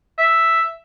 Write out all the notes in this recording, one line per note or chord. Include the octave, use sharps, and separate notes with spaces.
E5